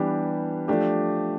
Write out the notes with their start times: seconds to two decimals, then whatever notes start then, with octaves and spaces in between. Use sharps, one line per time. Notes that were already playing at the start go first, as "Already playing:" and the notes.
Already playing: E3 G3 B3 D4 G4
0.68 F3 A3 D4 G4